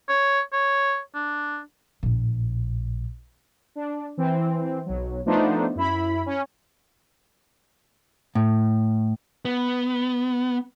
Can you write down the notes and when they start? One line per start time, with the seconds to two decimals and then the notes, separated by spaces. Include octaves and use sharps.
0.09 C#5
0.52 C#5
1.14 D4
2.03 A#1 A2
3.76 D4
4.17 E3 C4
4.86 B1 F#3
5.26 F3 A3 B3 D4 D#4 C5
5.75 F#2 E4 B5
6.26 C#4
8.35 A2
9.45 B3